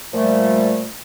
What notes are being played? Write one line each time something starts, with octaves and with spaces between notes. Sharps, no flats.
A#2 F3 G3 A3